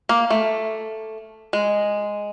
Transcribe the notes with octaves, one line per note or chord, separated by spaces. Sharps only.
A#3
A3
G#3